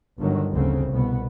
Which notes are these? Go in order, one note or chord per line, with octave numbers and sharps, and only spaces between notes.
G1 D3 D#3 F#3
F1 D2 C#3 C4
C2 B2 B3